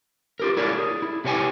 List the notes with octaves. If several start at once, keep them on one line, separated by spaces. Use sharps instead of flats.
F4 G4 A#4
D4 E4 A#4 C#5 D5
G#4
E4
C3 G4 B4 C#5 G5 G#5